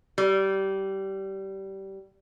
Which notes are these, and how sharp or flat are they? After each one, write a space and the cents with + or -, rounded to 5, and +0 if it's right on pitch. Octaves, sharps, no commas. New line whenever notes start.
G3 -20